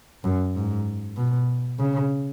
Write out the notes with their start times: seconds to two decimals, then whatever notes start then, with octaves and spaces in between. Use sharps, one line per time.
0.24 F#2
0.55 G#2
1.17 B2
1.79 C#3